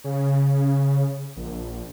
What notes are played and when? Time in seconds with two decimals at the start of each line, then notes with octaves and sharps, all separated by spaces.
0.04 C#3
1.37 A#1